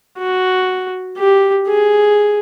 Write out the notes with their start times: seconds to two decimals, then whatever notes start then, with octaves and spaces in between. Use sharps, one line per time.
0.19 F#4
1.18 G4
1.68 G#4